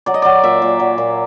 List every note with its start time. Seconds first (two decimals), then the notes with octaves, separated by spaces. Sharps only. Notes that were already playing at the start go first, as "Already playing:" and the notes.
0.06 F#3 D5
0.14 D#5
0.22 F#3 D5
0.43 A#2 E5
0.62 A#2
0.79 F#3
0.98 A#2